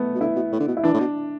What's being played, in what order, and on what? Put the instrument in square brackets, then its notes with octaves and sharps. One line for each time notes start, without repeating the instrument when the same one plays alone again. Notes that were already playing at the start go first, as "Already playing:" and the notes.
Already playing: [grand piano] A3 B3
[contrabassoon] B2
[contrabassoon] D3 [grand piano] E4
[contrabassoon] B2
A2
D3
B2
[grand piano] E4
[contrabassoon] E3 [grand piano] D4
[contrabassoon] A2
B2